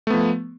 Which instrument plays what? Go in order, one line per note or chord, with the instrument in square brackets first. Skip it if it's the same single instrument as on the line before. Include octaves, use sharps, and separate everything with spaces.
[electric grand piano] A3
B3
F3